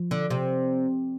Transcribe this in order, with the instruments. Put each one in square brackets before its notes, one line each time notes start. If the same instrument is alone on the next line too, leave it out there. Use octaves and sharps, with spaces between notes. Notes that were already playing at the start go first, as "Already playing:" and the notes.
Already playing: [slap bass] F3
[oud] D3
C3